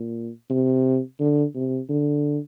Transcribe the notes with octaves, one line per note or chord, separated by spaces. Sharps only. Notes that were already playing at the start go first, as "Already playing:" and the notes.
Already playing: A#2
C3
D3
C3
D3